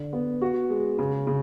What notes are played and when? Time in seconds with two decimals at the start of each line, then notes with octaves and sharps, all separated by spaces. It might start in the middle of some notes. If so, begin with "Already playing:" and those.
Already playing: D3
0.13 B3
0.42 F#4
0.70 G#3
0.99 C#3
1.27 C#3